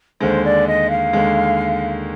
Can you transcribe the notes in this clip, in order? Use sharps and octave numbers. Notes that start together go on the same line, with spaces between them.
D#2 D3 G#3 C5
D5
D#5
F5
D#2 D3 G#3